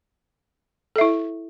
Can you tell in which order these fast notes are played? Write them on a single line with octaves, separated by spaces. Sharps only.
A4 E5 E4